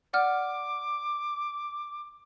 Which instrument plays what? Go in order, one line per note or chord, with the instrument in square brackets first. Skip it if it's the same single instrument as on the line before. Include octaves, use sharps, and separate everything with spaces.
[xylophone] D5 F#5 F6 [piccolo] D6